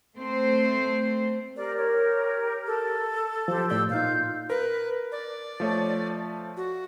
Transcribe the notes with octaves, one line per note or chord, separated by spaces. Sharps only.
A3 C4 C5
G4 A#4 D5
C#5
A4
F3 G4 C5
A2 D5 E6 G6
A#2 D#4 F4 F5 G6
A#4 B4
D5
F3 A3 C#5
F#4